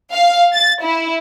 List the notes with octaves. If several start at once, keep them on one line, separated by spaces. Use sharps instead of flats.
F5
A6
E4